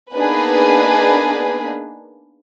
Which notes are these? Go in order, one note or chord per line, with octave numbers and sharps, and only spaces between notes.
A#3 B3 D4 D#4 G#4 B4